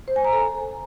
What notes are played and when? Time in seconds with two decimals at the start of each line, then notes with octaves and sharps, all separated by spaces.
0.08 C5
0.16 G#5
0.25 A#5
0.33 A4